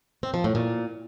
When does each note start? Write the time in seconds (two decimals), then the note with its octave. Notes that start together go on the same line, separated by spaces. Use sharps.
0.23 C4
0.34 F3
0.44 A2
0.55 A#2